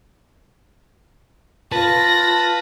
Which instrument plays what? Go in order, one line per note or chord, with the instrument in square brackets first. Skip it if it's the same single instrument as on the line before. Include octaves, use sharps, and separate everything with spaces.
[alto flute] F4 [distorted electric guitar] B4 [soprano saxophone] A5 [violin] A#6